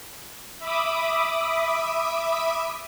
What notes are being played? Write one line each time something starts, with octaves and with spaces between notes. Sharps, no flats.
E5 B5 D6 D#6